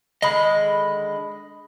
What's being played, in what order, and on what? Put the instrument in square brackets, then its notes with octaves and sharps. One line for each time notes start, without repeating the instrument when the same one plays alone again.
[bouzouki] D3 D#3 G#3 [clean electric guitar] D#5 B5